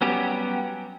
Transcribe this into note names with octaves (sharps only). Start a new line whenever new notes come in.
F#3 G3 B3 C#4 G4